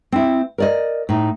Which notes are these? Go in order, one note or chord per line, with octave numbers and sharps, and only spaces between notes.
C4 E4
A#4 D5 D#5
A2 D#4